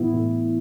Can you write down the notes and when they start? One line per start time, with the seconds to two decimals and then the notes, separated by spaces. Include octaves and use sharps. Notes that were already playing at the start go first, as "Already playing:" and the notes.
Already playing: A2 E3 B3 E4
0.14 A2